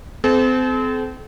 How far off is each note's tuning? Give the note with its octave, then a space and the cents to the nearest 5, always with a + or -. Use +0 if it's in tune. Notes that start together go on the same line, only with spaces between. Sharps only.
C4 -30 A4 -45